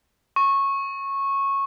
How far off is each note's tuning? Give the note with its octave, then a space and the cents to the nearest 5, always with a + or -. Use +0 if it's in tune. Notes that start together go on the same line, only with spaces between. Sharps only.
C#6 -15